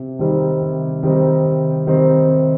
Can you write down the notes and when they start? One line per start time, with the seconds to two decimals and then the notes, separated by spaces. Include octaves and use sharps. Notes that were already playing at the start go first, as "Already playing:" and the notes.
Already playing: C3
0.19 D#3 G3 C4 D#4
0.62 C3
1.03 D#3 G3 C4 D#4
1.45 C3
1.87 D#3 G3 C4 D#4
2.28 C3